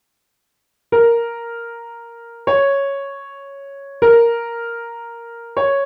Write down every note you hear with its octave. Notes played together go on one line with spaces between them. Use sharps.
A#4
C#5
A#4
C#5